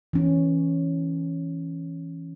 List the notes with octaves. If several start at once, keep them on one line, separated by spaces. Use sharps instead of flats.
E3 C#4